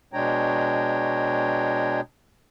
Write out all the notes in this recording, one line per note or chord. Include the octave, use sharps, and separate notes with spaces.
B2 G#3 D4 C#5 G5 A#5